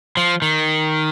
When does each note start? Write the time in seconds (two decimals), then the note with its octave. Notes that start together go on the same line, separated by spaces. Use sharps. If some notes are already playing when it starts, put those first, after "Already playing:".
0.17 F3
0.42 D#3